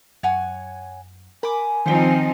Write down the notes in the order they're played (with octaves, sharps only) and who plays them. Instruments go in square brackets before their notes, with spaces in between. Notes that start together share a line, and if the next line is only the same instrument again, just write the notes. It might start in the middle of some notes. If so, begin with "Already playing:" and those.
[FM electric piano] F#2 [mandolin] C#5 F#5 G#5
[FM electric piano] A#4 [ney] G#5 [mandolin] B5 D6
[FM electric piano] D#3 [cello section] F3 C4 D#4 [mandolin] C5 G5